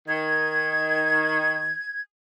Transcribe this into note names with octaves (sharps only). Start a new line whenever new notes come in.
D#3 G#6